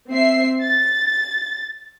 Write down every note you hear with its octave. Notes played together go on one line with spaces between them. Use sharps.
C4 E5 C7
A6